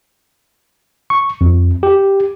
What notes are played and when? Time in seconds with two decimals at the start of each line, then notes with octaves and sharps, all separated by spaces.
1.10 C#6
1.41 F2
1.83 G4